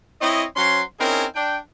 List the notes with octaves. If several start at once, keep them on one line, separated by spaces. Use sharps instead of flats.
C4 E4 C#5 D#5
F#3 C#4 C5 C6
C4 C#4 D#4 E4 G#4 A#4
D4 G5